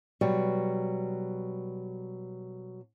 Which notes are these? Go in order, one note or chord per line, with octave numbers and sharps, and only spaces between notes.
B2 F#3 G3